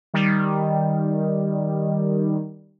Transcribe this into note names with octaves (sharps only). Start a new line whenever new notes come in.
D#3 G3